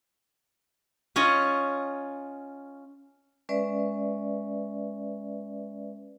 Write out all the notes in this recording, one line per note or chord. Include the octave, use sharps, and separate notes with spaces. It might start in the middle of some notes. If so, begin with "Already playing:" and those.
C#4 F4 C#5 D#5
G#3 C#4 B4 D5 E5